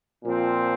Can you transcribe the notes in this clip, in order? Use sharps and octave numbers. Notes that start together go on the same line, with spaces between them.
A#2 F3 C4